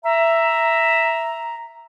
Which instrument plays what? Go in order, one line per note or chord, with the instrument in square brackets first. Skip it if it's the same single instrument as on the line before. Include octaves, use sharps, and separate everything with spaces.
[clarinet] E5 [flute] A#5